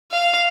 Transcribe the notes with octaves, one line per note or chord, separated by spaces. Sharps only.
F5